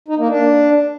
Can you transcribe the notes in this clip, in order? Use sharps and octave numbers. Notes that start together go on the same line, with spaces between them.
D#4
A#3
D4